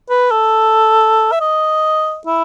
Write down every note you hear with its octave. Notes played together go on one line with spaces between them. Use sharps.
B4
A4
E5
D#5
E4